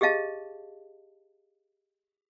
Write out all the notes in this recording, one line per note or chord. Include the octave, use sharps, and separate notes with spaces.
G4 G#4 D#5 F5 A5